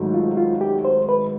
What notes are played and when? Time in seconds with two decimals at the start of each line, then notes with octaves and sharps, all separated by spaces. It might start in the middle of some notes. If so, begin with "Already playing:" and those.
Already playing: G#1 G#2 D#3 F#3 A3
0.14 F4
0.37 F4
0.61 G4
0.85 C5
1.09 B4